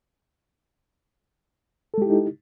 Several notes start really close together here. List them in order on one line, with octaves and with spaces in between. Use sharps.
A4 G#3 G4 E4 D#4